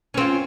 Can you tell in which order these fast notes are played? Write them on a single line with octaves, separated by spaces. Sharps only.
C#4 C4 F4